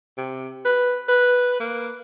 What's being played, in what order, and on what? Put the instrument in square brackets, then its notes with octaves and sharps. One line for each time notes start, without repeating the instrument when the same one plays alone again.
[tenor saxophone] C3
B4
B4
A#3